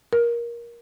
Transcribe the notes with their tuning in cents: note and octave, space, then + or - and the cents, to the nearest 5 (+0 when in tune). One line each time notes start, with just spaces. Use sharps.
A#4 +15